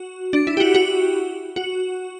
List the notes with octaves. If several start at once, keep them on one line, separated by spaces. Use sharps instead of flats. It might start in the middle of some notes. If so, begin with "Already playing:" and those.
Already playing: F#4
D4
E4
G4
F#4
F#4
F#4